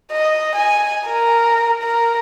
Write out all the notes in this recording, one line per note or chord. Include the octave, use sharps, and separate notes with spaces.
D#5
G#5
A#4
A#4